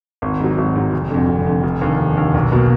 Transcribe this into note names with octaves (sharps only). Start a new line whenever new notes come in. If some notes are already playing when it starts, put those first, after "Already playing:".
G#1
G#2 F#3
G#1
G#2 F#3
F1
F2 D3
F1
F2 D3
F1
D#2 D3
F1
D#2 D3
B1
B2 A#3